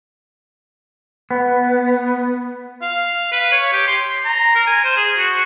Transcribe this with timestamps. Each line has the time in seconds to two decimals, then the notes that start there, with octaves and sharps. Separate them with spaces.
1.31 B3
2.82 F5
3.32 B4
3.52 C#5
3.73 G4
3.88 C6
4.25 A#5
4.55 A#4
4.66 G#5
4.84 C5
4.97 G#4
5.18 F#4